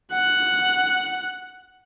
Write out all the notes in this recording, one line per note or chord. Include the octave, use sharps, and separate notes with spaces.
F#5 F#6